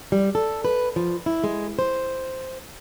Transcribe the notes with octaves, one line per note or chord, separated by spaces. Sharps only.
G3
A4
B4
F3
E4
G#3
C5